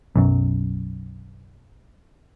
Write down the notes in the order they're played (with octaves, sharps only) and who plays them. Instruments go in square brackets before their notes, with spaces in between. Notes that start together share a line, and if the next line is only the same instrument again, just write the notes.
[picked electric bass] B1 F#2